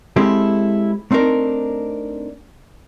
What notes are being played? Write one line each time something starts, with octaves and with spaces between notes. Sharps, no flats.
G#3 C4 E4 G4 A4
A3 C4 D4 D#4 A#4